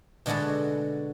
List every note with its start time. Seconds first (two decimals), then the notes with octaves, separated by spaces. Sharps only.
0.26 B2 D3 G#3 B3 F#4 A4